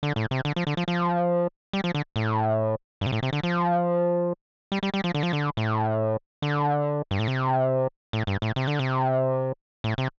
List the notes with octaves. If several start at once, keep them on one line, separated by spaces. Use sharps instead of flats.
D3
A2
C3
D3
F3
D3
F3
F3
G3
F3
D3
A2
G2
C3
A2
C3
D3
F3
G3
G3
G3
F3
D3
F3
D3
A2
D3
G2
A2
C3
A2
G2
A2
C3
D3
C3
A2
C3